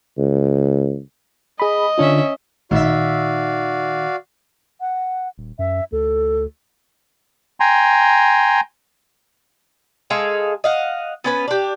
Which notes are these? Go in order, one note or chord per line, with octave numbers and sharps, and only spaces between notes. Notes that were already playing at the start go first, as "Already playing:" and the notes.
C#2
G#4 D#5 B5
D3 C#4 D4 F4 E5
A1 A#2 D#3 D#4 F#4 D5 E5 F5
F#5
D#1
F#2 E5
D2 A4
G5 G#5 A#5 C6
G#3 G#4 A4 F5
D#5 F5 F#5
B3 C#4 B4
D4 G4